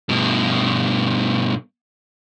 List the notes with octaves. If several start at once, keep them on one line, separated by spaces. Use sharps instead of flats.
G2 B2